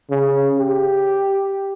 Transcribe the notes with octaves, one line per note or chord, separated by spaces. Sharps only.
C#3
G4